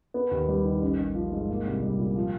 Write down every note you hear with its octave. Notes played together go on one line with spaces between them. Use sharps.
B3
D#2
G3
D#3
A1
A1
F3
G#2
A#3
C2
G3
A#2
F3